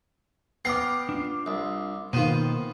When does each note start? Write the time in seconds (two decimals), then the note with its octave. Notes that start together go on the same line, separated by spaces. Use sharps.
0.65 B3 G5 A#5 D6 F6 C7
1.09 D4 F4
1.46 C2
2.13 B2 D#3 A#3 B3 F4 C5 D#7